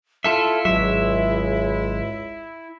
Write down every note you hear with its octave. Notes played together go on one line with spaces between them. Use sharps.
E4 F4 A4 E5
G#1 C#2 F#3 G#3 E5